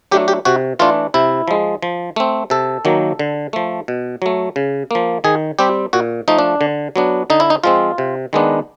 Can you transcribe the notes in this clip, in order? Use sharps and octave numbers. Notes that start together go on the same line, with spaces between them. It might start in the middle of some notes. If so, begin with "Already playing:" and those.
F#3 A3 D4 G4
G4
C3 F#4
E3 A3 D4 F4
C3 E4
F3 G#3
F3
A3 C4
C3 A4
D#3 F#3 A#3
D3
F3 A3
B2
F#3 A3
C#3
F3 A#3
D#3 G#4
G3 C4 G4
A#2 F#4
F3 A3 D#4
D4
D3
F#3 B3 D4
D3 D#4
E4
D#4
F3 G#3 C4 F4
C3
D#3 G#3 B3 D4